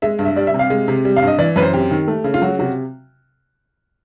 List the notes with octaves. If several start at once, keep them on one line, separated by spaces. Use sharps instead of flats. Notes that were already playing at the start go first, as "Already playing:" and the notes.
G#3 E5
G2
E5
G3 D5
E5
C3
F5
G#3
C3
G3
F5
G2
D#5
E3 D5
F#2 B4
C5
C4 G4
D#3
A3
C#3
F4
F#3 F#4
C3 F#4